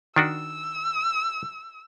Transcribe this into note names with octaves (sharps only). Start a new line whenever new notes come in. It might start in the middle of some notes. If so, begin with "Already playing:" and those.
D#3 D4 F#4 E6